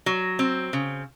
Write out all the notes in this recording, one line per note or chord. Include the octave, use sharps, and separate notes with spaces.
F#3
C4
C#3